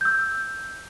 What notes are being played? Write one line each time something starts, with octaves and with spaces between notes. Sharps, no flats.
E6 G6